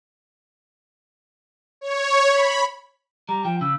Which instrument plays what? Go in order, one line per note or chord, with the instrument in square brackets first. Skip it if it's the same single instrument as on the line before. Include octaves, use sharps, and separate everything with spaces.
[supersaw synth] C#5
B5
[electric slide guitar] G3 [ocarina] A#5
[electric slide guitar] F3 [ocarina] G5
[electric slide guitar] C#3 [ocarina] E6